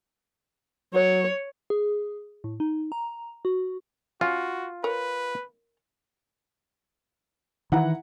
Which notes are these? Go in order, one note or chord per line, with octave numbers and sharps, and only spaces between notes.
F#3 C#5
G#4
A2
D#4
A#5
F#4
C#4 F4 F#4
A#4 B4 C#5
D#3 E3 E4 F#5 A#5